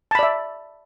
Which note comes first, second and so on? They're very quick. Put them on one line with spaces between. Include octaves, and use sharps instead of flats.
A5 B5 D5 E5